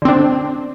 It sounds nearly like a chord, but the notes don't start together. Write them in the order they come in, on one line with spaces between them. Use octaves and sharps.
D3 C4 D4